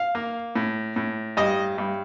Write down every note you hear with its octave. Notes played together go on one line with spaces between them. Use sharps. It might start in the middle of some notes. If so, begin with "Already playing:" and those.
Already playing: F5
A#3
A2
A2
G2 D#5
G2